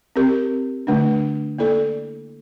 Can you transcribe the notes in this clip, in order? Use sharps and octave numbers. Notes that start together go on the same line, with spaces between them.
C4 G4 A#4
D3 A3 D4
A#3 E4 A4 D5